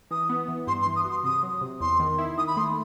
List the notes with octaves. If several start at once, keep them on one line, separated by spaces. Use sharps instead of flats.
E3 D#6
B3
E3
G2 C6
C6
E3
D#6
F#4
C6
C3 D#6
F#3
C3
E2 C6
D#3
E4
D#3 D#6
B5
A3 C6